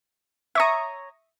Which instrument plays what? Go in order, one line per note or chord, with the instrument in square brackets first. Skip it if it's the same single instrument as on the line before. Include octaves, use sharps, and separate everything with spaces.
[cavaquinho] C#5 A#5 [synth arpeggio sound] E5 C#6 D#6